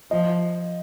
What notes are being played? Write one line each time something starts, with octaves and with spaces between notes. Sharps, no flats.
F3 D#5